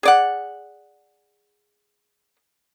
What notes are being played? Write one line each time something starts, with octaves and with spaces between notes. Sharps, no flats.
G#4 D5 F#5